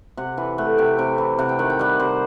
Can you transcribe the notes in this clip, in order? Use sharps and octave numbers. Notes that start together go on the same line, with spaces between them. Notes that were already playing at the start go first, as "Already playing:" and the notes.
C3 F#5
E3
A3 F#5
C3 G5
C3 G5
E3
C3 F#5
G5
D#3 F#5
G5
G3 F#5
C3 C5